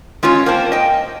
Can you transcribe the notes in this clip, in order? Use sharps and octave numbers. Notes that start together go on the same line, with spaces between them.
G#3 C#4 F4 C#5
A#3 C4 A5
D#5 G5